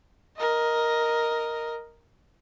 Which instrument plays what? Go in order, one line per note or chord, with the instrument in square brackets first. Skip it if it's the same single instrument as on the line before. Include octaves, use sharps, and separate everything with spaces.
[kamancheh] A#4 D#5